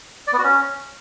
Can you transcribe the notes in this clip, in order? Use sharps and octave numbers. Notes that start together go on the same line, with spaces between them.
D5
B3
F#4
C#4